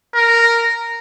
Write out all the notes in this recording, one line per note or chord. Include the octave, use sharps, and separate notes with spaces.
A#4